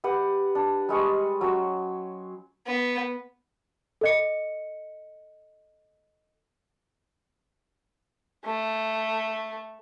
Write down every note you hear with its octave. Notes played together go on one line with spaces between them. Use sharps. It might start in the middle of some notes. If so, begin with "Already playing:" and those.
G4 B4 F#5
D4
G3 G#3 C#6 D#6
F#3 C#4 C5
B3
A4 D#5 C#7
A3